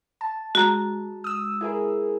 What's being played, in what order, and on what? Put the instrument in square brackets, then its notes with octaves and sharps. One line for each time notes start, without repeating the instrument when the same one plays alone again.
[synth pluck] A5
[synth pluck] G#3 [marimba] F#4 A#5
[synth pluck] D#6 E6
E4 G#4 A#4